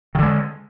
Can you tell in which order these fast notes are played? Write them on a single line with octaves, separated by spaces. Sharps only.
D#3 D3 G#3